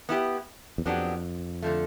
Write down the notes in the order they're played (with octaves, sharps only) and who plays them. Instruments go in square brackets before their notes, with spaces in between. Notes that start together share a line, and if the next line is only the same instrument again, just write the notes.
[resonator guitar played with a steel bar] B3 E4 G4
[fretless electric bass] E2
[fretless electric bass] F2 [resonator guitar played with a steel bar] F#3 B3 D4 G4
[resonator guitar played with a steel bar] D3 F3 A3